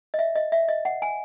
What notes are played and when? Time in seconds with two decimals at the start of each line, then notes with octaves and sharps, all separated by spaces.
0.14 D#5
0.19 E5
0.36 D#5
0.52 E5
0.69 D#5
0.85 F#5
1.02 G#5